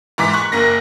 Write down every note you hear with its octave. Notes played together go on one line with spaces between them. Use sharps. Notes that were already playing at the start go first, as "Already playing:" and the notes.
G#2 E3 D6 B6
C#6 F#6
F#1 A#3 A#6